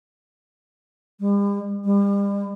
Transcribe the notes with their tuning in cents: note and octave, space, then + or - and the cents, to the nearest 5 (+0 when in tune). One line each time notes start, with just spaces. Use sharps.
G3 +45
G3 +40